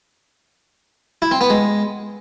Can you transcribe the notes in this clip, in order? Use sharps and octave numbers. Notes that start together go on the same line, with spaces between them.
E4
C4
B3
G#3